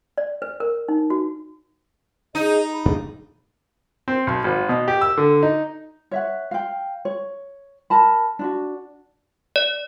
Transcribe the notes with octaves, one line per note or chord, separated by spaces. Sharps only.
D5
B4
A#4
D#4
F#4
D#4 G#4 D#5
B5
G2 D4 G#4
C4
B1
G#1
B2
G4
E6
D3
D#4
C#5 E5 F#5
F5 G5
C#5
A#4 A5 B5
D4 F4 F#4
D5